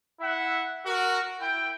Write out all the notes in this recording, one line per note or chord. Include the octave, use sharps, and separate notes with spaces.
E4 E5 F#5
F#4 A#4
E4 G5